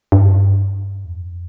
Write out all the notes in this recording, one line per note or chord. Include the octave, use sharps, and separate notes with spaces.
G2
E2
F2